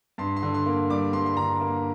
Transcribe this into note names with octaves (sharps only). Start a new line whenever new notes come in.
G2 C6
C6
D3
C6
A#3
G3 D6
G2 C6
C6
D3 A#5
A#3